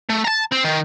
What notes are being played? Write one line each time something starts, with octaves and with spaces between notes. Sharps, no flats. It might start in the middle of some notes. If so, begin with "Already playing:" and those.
A3
A5 A#5
C4
D#3